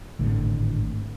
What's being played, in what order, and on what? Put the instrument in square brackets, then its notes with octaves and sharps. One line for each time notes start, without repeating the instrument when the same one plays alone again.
[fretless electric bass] G#1 A2 D3